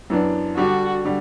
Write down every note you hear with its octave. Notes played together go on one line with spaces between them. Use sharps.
F#2 E3 B3 D4
D3 G3 D4 F#4
D3 G3